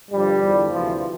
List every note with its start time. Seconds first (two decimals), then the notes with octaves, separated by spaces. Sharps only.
0.11 G2 D3 F3 G3
0.41 E2 D3 F3
0.70 D2 C3 E3 F3